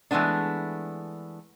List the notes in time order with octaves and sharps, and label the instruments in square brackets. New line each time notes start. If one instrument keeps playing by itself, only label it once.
[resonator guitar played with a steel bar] E3 G#3 A3 B3 D4